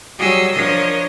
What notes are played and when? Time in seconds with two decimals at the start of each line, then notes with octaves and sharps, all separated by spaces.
0.18 F#3 G3 G#4 C#5 D#5 E6
0.52 F3 D4 A#4 C#5 D#5